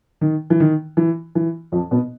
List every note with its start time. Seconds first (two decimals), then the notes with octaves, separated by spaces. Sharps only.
0.21 D#3
0.50 E3
0.60 D#3
0.97 E3
1.35 E3
1.72 F2 F3
1.91 B2 B3